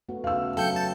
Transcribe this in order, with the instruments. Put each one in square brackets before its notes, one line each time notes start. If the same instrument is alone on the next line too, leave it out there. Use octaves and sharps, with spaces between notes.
[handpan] A3 B3 F#4
[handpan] C#3 [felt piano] F5 E6
[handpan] F#3 [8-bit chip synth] A4 G6 C#7 [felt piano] F5 G5
[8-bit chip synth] A5